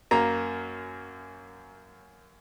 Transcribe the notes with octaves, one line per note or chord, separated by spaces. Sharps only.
F#2 A#3 A#5